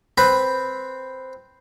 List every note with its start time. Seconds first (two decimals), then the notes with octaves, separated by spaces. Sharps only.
0.18 C4 B4